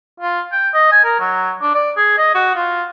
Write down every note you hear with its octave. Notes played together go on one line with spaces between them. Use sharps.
F4
G5
D#5
G#5
A#4
F#3
D4
D5
G#4
D#5
F#4
F4